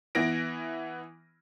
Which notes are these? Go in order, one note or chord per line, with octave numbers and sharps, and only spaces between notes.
E3 B3 A#6 D7